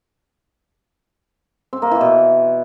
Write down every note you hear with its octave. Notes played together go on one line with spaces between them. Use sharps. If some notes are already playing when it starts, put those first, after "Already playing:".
C4
A#3
E3
B2